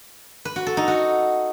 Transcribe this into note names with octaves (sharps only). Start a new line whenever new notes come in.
B4
F#4
A4
D#4
F#4